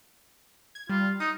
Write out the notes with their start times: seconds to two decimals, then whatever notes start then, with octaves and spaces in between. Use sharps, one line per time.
0.75 G#6
0.89 G3 F4
1.20 D#4 D#6